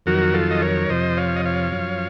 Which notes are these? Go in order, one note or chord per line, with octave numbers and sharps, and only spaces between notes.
F2 D#3 F#3 F#4 A#4
F4 A4
D#5
A#4 C#5
F2 C3 F3 C5 D#5
C#5 F5
D#5
C#5 F5
F#2 F3